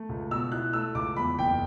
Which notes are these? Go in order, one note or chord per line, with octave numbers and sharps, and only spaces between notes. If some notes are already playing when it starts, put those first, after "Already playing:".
Already playing: A3
C#2
B2 E6
E4 F#6
A3 E6
C#2 D6
E2 B5
F#1 G5